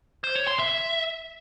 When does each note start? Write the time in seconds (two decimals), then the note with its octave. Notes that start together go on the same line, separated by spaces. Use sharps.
0.24 C5
0.36 C#5
0.47 C6
0.59 E5